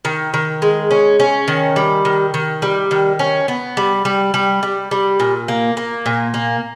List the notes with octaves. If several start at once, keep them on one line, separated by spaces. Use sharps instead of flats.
D#3
D#3
G#3
C#4
C#4
D#3
G3
D#3
D#3
G3
D#3
C#4
B3
G3
G3
G3
G3
G3
A#2
A#3
A#3
A#2
A#3